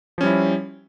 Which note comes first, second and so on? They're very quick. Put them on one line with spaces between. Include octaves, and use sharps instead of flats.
F3 C#4 G3 E4